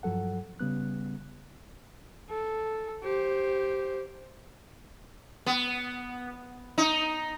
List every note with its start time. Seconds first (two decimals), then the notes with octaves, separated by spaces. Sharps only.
0.03 G2 F3 F#3 A4 F#5
0.60 C#3 G3 B3 F#6
2.30 A4
3.04 G4 C5
5.46 B3
6.78 D#4